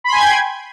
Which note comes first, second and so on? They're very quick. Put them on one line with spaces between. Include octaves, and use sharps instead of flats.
B5 C6 G#5 G#6 G5